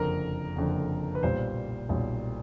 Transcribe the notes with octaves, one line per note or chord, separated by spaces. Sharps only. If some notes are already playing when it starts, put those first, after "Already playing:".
Already playing: F#1 F2 D3 A#4
F#1 F2 D3
B4
B1 A#2 G3 C5
B1 A#2 G3